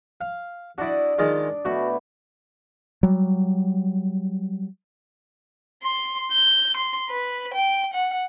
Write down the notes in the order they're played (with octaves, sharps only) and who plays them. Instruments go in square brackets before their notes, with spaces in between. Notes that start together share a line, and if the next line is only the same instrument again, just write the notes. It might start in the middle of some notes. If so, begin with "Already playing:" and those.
[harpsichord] F5
[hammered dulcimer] D4 D5 D#5 [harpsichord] E4 F#4
[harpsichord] D#3 G#3 F4
[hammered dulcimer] B2 A3 E4 [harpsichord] F#4
[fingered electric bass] F#3 G3
[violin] C6
G6
C6
B4
G5
F#5